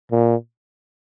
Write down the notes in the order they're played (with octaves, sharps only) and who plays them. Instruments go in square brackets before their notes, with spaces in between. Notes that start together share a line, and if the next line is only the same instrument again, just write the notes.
[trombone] A#2